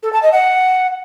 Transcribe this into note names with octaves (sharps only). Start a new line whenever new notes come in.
A4
A5
D#5
F#5